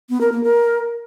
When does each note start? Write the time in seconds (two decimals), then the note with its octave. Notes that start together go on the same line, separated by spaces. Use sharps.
0.09 B3
0.21 A#4
0.32 A#3
0.43 A#4